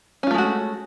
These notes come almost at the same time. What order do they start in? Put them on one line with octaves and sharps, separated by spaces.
C#4 F4 A3 G#3 F#4